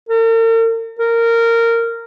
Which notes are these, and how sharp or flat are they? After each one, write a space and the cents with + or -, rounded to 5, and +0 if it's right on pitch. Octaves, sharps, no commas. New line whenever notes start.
A#4 -45
A#4 -15